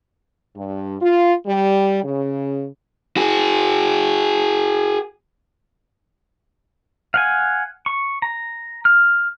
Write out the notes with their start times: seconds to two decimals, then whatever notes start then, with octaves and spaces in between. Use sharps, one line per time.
0.55 G2
1.01 F4
1.46 G3
2.03 C#3
3.17 F#4 G#4
7.14 F5 F#5 G#5
7.86 C#6
8.22 A#5
8.85 F6